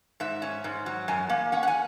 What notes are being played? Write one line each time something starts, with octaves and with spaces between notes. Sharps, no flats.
G#2 E5
C#4
G#2
F#3
F#2 G#5
A#3
C#4 F#5
F#5
G#5